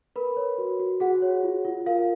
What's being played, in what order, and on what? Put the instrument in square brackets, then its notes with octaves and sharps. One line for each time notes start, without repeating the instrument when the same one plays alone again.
[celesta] A#4 B4 B5
C#5
F#4
F#4
F#4 G#4 F#5
C#5
F4
F4
A#4 F5